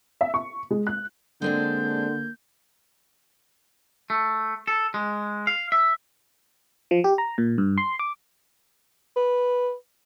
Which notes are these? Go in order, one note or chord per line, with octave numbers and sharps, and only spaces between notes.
E5
C#6
G#3
F#6
D3 G#3 A#3 C4 D4 G6
A3
A4
G#3
F5
E5
F3
G4
A#5
A#2
G2
C6
D6
B4